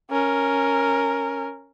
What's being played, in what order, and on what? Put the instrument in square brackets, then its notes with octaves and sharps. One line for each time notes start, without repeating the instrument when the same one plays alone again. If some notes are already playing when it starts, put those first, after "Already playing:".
[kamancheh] C#4 A#4